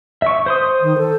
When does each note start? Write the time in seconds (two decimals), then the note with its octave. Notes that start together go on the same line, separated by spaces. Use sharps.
0.22 E5 C#6
0.46 C5 C6 D#6
0.82 D#3
0.98 A4